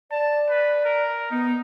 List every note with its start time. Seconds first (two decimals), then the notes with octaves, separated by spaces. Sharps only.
0.11 D5 A5
0.49 B4
0.85 A#4
1.31 B3 D#4